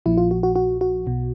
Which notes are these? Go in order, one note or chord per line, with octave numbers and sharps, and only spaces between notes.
A#1 A#2 F3 E4
F4
F#4
F#4
F#4
F#4
B1 B2